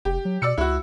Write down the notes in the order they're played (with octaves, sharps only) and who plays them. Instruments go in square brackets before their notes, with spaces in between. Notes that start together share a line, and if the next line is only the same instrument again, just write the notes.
[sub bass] F1 [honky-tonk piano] G4
[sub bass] F#3
[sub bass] B2 [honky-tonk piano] D5 E6 C#7
[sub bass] C#2 [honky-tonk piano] E4 F#4